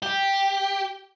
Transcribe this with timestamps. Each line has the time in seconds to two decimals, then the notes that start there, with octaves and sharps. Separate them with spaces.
0.03 G4